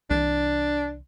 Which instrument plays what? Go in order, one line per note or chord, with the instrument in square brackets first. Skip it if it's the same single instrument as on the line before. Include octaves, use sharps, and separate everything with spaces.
[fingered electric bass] C2 E3 [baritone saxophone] D4